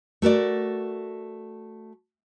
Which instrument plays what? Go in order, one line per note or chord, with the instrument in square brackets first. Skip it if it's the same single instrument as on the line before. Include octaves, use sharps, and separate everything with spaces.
[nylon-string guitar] A3 F#4 A#4 D5